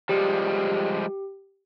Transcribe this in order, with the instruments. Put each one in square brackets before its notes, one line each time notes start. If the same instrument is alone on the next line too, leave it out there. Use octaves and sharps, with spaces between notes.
[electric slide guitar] F3 G3 G#3 [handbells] G4